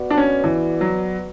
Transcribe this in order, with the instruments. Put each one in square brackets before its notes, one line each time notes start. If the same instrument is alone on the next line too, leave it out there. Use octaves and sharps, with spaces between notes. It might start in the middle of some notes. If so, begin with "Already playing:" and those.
Already playing: [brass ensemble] B3 F#4 B4 D5
[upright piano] D4
C#4
E3
F#3